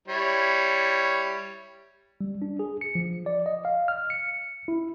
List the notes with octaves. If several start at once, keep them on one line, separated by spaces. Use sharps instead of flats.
G3 E4 C#5
G3
D4
G#4
C#7
F3
D5
D#5
F5
F6
C#7
E4